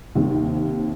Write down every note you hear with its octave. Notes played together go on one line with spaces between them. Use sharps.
D#2 C3